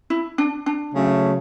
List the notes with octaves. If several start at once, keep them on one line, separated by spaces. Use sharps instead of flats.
E4
D4
D4
C#3 F#3 A3